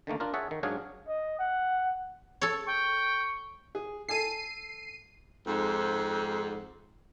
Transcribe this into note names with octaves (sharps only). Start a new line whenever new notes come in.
D3 D#3 A3 A#3
D4 F4 A#4
G#4 C#5 E5 F#5 A5
D#3
G#2 F#3 D4 G#4 C#5 F5
D#5
F#5
A4 C#5
G5 C#6
G#4
A4 G#5 A5 C7 D#7
F2 G#2